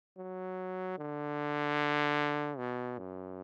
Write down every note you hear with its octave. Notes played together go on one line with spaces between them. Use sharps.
F#3
D3
B2
F#2